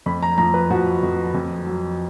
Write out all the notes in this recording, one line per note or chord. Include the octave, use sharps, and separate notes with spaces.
F2 B5
A#5
F3 A#5
B4
F3 F#4
F2
F2
F#3